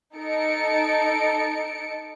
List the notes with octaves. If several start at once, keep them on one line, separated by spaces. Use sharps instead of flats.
D#4 A4 C#7 D7